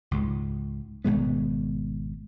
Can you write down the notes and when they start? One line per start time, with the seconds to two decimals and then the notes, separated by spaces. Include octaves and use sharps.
0.11 C#2 G#2
1.05 G#1 B2 G#3 B3